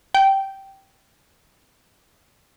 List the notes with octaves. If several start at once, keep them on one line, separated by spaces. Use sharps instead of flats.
G5